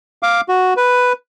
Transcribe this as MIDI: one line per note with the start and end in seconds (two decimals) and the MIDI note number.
0.23 0.41 77
0.23 0.41 86
0.49 0.74 66
0.77 1.13 71